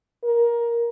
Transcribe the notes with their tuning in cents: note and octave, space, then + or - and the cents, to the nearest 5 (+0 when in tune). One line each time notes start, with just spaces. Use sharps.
A#4 +15